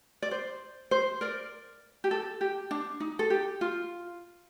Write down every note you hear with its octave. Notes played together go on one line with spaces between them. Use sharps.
D5
C5
C5
A#4 D5
G4
A4
G4
D4
D#4
A4
G4
F4